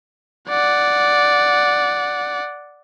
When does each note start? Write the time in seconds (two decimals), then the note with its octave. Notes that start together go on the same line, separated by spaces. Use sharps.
0.49 D5 F#5